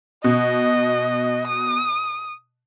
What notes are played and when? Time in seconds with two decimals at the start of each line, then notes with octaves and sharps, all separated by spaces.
0.24 B2 D#5
1.48 D#6